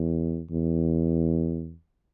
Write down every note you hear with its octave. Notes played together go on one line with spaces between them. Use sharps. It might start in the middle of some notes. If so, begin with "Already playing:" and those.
Already playing: E2
E2